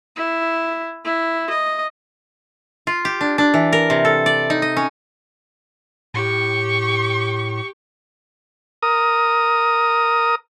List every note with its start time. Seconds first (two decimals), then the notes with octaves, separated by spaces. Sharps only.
0.17 E4
1.05 E4
1.50 D#5
2.87 F4
3.05 G4
3.21 D4
3.38 D4
3.54 E3
3.73 A#4
3.90 C3
4.05 A4
4.26 D5
4.50 D#4
4.62 D#5
4.77 C#4
6.14 A2 G4 C#6
8.83 A#4 D#6